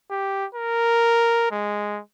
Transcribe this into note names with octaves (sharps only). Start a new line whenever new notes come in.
G4
A#4
G#3